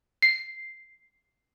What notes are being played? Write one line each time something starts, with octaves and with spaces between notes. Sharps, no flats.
C7